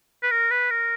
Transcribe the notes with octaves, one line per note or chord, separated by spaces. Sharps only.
B4
A#4
B4
A#4